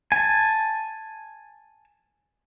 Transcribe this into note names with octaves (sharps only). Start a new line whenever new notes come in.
G#5 A5